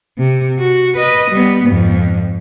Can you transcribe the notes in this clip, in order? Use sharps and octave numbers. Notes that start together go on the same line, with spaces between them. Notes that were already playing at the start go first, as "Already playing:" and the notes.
C3
F#4
B4 D#5
G3 B3
F2 G#2